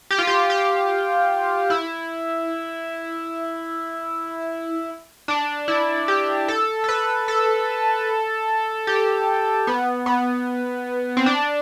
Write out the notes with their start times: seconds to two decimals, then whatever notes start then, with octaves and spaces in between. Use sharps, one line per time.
0.11 G4
0.19 F4
0.27 G4
0.50 G4
1.70 E4
5.28 D4
5.68 E4
6.08 G4
6.48 A4
6.84 A4
6.89 B4
7.28 A4
8.87 G4
9.67 B3
10.06 B3
11.17 C4
11.26 D4